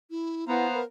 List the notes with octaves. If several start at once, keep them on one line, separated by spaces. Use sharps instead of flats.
E4
B3 E4 C5 F5 A#5
A#4